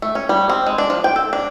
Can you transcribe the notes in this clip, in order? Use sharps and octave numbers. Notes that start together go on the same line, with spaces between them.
A3
C#4
G3
C4
G#3
D4
F3
G5
A4
D4